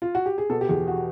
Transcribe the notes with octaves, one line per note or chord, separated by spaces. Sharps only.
F4
F#4
G4
G#4
B2 A4
G4
E2 G#4
F#4